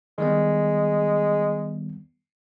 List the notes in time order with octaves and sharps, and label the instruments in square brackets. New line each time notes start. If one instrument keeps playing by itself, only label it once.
[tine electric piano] D#3 G3 B3 [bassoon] G#3